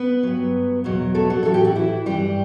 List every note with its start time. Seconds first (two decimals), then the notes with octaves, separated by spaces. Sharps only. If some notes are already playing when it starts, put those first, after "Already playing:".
Already playing: B3 B4
0.23 G2 F#3
0.84 E2 B2 F#3
1.15 A3 A4
1.30 F#3 F#4
1.43 A2 E3 A4
1.54 G4
1.65 F#4
1.75 E3 E4
2.06 G2 E3 G3 G4